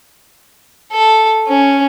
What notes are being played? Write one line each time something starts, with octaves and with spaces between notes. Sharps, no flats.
A4
C#4